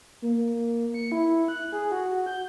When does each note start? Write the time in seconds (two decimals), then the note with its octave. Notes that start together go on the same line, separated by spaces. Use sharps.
0.22 A#3
0.94 C#7
1.12 E4
1.48 F#6
1.72 G#4
1.92 F#4
2.26 G6